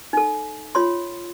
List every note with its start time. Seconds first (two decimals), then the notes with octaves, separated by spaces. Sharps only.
0.13 D#4 A4
0.75 F4 C#5 C6